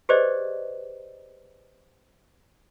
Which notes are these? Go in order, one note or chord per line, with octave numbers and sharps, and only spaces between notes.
G4 G#4 B4 C5 D5 D#5